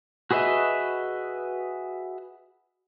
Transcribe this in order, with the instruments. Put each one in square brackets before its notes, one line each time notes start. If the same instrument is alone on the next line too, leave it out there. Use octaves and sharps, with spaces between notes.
[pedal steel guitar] F#4 G#4 B4 D#5 E5